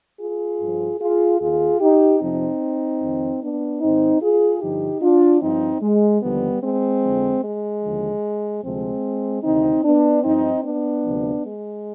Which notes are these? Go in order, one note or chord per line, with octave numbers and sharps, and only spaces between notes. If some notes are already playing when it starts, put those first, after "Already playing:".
F4 G#4
G2 F3
F4 G#4
D#2 D#3 F4 G#4
D#4 G4
F2 C3 F3 C4 D#4
F2 D#3
B3 D4
G#2 D#3 C4 D#4
F4 G#4
G2 D3 F3 D#4 G4
D4 F4
G2 F3 C4 D#4
G#3
D#2 D3 F3 G3 B3
G#3 C4
F2 D3 F3
G#3
D#2 D3 F3
D2 C3 F3 G#3 C4
D2 C3 D#3 C4 D#4
B3 D4
G2 F3 C4 D#4
B3 D4
D2 C3 F3
G#3